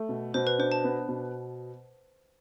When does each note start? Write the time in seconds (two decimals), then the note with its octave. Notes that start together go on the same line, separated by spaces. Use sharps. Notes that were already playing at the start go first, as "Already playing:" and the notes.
Already playing: A3
0.09 B2
0.34 B2 C5
0.47 B4
0.58 D4 C5
0.72 A5
0.84 B3
1.09 B2